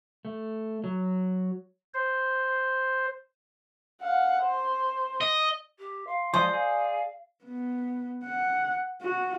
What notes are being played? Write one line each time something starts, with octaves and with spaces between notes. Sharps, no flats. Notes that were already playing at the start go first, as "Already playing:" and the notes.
A3
F#3
C5
F5 F#5
C5
D#5
G4
F5 C6
F3 G#3 C5 D5 D#5
G#4 F5
B3
F#5
F#4